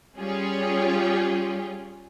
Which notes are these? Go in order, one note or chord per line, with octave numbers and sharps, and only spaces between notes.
G3 C#4 F4 G4 G#4 C#5